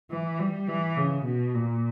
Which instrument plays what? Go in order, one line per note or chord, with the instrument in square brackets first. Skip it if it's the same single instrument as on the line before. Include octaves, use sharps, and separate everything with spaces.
[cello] E3
G3
E3
C#3
B2
A#2